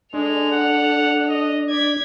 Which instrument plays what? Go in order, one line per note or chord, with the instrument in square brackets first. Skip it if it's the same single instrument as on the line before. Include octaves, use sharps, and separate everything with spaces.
[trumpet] G#3 [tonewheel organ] D4 [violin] A4 F7
[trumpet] F#5
D#5
[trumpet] D5 [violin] G#6 B6